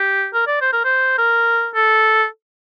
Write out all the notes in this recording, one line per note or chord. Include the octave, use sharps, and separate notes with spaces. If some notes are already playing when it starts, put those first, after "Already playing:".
Already playing: G4
A#4
D5
C5
A#4
C5
A#4
A4